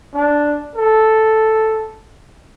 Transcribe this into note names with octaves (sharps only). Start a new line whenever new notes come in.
D4
A4